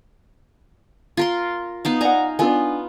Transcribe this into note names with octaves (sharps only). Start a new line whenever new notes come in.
F4 A#4 C6
B3 D#4 F5
D5 F#5 G#5 A#5
B3 D4 F4 G#4 G#5